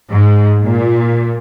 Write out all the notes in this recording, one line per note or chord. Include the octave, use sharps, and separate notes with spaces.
G#2
A#2